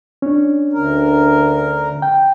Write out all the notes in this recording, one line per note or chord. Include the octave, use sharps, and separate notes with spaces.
C#4 D4
D2 A#4
G5